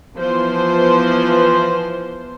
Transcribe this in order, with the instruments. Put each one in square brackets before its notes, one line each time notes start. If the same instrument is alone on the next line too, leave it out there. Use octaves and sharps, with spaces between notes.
[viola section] E3 F3 B3 C5